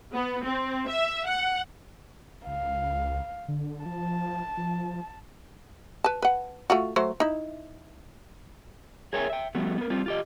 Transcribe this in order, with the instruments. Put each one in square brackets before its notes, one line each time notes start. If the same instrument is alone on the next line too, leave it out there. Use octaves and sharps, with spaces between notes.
[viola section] B3
C4
E5
F#5
[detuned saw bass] C#2 [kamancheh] F5
[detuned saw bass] D3
[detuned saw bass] F3 [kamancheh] A5
[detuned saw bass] F3
[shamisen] B4 A5
B4 F#5
A3 F4 F#4
F#3 A3 C5
D#4 E4
[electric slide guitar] G#4 A#4 C#5 E5 G5 G#5
E5 G5
F3 G3 A3 B3 F#4
B3 A#4
G3 C4 F4
F4 G4 D#5